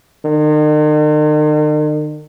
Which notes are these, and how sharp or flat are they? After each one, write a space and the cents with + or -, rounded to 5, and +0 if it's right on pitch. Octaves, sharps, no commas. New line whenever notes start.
D#3 -45